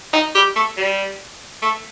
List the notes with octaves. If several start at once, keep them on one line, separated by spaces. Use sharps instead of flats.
D#4
G4
A3
G3
A3